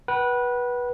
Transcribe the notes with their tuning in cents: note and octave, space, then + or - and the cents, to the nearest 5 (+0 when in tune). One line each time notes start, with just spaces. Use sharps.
B4 -20 F#5 +40